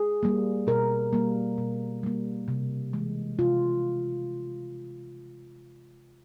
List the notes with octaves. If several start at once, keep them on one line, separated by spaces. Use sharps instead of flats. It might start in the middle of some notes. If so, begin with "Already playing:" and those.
Already playing: G#4
G3 A#3
B2 A#4
G3 A#3
B2
G3 A#3
C3
E3 G#3
C3 F4